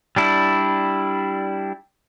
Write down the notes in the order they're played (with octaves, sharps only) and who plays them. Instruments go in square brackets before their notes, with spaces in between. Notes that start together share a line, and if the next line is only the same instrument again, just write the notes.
[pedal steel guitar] G3 D4 E4